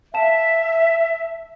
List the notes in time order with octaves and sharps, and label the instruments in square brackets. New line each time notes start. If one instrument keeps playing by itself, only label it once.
[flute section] E5 [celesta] F5 A5 E7